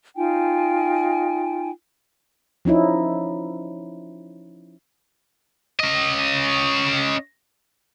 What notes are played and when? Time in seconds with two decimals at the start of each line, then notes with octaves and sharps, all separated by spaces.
0.16 D#4 F4 G5 G#5
2.65 F3 C#4 D#4 E4
5.80 C#4 D#5